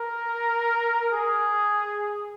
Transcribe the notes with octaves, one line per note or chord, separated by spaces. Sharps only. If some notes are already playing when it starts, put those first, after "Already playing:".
Already playing: A#4
G#4